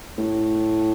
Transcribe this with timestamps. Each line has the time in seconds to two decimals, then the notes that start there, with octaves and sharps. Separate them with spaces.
0.18 A2